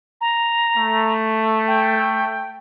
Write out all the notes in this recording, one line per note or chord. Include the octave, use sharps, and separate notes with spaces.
A#5
A3
G5